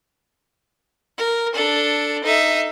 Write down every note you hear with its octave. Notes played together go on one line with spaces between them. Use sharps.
A#4
D4 A4
D#4 E5